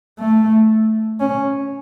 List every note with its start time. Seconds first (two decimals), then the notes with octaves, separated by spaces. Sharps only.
0.18 A3
1.20 C#4